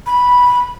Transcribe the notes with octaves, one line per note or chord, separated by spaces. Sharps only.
B5